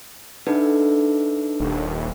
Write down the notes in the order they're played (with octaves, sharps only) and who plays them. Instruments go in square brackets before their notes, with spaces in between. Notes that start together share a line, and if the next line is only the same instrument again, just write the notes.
[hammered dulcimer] D3 E5 [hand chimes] D4 D#4 B4
[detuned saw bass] D#1